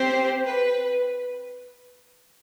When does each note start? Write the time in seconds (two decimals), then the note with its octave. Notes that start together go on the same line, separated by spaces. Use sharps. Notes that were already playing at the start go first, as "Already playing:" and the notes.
Already playing: C4 G4 C5
0.46 B4